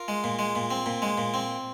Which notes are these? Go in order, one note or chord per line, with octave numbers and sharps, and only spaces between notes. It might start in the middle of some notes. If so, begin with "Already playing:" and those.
Already playing: F4 A#4
G#3
A#2
G#3
A#2
C4
A#2
G#3
A#2
C4